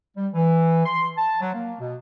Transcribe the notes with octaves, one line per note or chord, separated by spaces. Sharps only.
G3
E3
C6
A5
F#3
A#3
B2